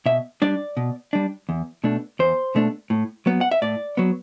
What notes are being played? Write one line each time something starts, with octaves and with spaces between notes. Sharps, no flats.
B2 E5
G3 D4 D5
B2
G3 D4
E2
B2 A3 D4
E2 C5
B2 A3 D4
A2
F#3 B3
F#5
E5
A2 D5
F#3 B3